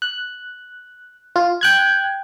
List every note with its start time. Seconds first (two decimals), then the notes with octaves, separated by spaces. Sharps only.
0.02 F#6
1.36 F4
1.61 G5 F#6 G#6